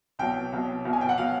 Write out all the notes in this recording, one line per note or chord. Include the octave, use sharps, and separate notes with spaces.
C2 B2 F#3 G5
C2 B2 F#3
C2 B2 F#3
G#5
G5
F#5
B2 F#3 F5